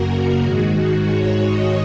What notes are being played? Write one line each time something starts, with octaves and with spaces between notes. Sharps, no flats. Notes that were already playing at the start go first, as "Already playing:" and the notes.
Already playing: F#2 C#3 A#3 F#4 A#4
G#2 D#3 G#3 F#4
F#4
C#5
D#5